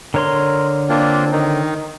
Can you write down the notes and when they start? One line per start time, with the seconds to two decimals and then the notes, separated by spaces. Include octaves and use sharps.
0.14 D3 A#4 C#5 C6
0.89 A#3 C4 D4 F4
1.32 D#3 D#4